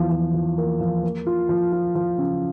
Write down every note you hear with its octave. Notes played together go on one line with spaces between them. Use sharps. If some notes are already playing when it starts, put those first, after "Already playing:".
Already playing: E2 F3
F3
F3
A#3
F3
A#3
F4
F3
F4
F3
C#3